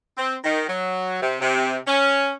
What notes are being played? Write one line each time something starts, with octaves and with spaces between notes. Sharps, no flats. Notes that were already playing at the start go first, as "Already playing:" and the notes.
C4
D#3
F#3
C3
C3
C#4